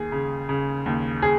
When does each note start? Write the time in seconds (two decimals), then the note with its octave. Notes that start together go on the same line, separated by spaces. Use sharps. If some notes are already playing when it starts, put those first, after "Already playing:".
Already playing: D#2 G#4
0.12 C#3
0.49 C#3
0.86 D#2
1.22 G#4